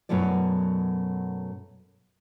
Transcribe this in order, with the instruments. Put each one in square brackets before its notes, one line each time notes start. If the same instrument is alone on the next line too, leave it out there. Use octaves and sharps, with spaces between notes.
[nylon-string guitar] F#2 B2 F#3 A3 E4 D5